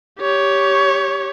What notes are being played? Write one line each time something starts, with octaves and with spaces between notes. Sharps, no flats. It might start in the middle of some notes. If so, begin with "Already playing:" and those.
G4 C#5